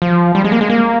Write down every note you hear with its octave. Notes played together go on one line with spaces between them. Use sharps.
F3
G3
G#3
A#3
G#3
A#3